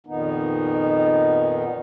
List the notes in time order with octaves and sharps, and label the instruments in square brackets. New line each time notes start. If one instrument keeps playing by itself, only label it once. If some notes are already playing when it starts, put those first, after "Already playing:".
[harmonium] F2 A#2 D#3 B3 D#4